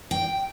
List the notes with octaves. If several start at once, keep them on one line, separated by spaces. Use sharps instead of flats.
G5